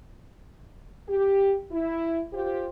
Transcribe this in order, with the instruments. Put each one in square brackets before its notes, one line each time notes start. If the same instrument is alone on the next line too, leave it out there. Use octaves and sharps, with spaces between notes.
[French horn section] G4
E4
F4 G4 C5